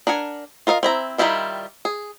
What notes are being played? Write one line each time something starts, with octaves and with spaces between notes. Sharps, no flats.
D4 A#4 F#5 G#5
F4 A#4 D#5 F5
C4 E4 A#5
D#3 E3 G3 E4 F4
G#4